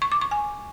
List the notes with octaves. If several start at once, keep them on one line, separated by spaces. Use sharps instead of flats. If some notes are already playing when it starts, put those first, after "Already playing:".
C#6
D6
C#6
G#5